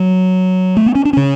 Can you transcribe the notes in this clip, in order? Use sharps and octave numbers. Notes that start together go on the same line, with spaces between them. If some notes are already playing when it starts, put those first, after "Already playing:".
Already playing: F#3
A3
B3
C#4
D4
C#3 C#4